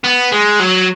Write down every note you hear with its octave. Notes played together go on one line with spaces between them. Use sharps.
B3
G#3
F#3